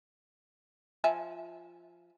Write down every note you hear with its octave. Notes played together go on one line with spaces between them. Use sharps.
F3 E5 G#5